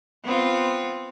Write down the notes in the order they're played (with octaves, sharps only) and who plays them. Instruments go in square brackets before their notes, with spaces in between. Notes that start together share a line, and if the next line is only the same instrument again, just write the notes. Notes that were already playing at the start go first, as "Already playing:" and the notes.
[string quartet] B3 C4 F4